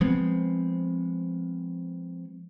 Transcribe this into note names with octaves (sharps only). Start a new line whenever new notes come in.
F3 G#3 B3 C4